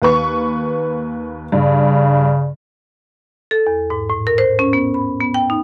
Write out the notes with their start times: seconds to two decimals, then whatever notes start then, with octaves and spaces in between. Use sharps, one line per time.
0.02 D#2 B4 C#6
1.52 G2 C#3
3.51 A4
3.67 E2
3.90 G#2
4.10 A2
4.27 A#4
4.38 C5
4.59 C#4
4.73 B3
4.94 B5
5.21 B3
5.34 G5
5.50 D#4